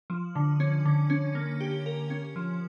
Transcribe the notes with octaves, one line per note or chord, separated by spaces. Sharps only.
F3
D3
C#4
D3
C#4
A#3
G4
A#4
C#4
F3